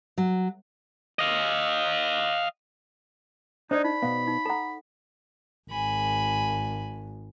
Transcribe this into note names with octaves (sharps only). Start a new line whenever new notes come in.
F#3
D#5 F5
D4 D#4 C5 D5 D#5
D#4 B5
B2 B3 F5
D#4
A4 F#5 A5 A#5
G#1 G#5 B5